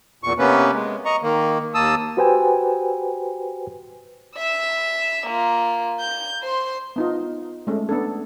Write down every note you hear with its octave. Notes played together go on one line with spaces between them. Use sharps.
E2 A#2 C#6
C3 A#3 B3 C#4 B4
G#3
D#5 A#5 C#6
D#3 A#3
D#2 A#3 A5 D#6 E6
F#4 G4 B4 C5 G5 G#5
E5 E6
A#3 F4
G6
C5 C6
B3 D#4 F4
G#3 A3 C#4
B3 D4 A4